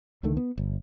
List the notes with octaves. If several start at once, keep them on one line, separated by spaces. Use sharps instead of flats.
C#2 D3 D#3 A3
B3
G1